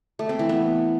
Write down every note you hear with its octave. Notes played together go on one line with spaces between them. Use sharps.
A3
C4
E3
B3